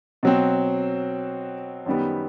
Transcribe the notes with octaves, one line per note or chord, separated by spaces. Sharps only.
B2 F#3 C4
F#2 D#3 G3 B3